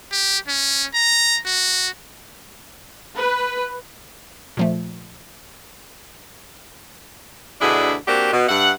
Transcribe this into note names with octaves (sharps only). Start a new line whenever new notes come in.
G4
C#4
A#5
F#4
B4
A#2 F3 A3
D2 B2 D4 E4 G#4
A#3 C4 D4 F#4 G4
B2
G2 E5 F#5